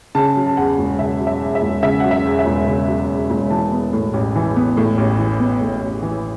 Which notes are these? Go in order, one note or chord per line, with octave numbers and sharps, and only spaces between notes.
C#3 A5
F#3
A5
E2 F#5
E1
C#3 E5
F#3
E5
E2
E5
E1
C#3 E5
F#3 F#5
E5
E2
E5
E1
C#3
F#3
E2
E1
E3 A5
B3
A2
A1
E3
B3
A2
A1
E3
B3
A2
A1
E3